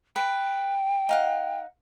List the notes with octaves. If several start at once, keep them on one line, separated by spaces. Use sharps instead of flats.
B4 G5
D#4 F5 F#5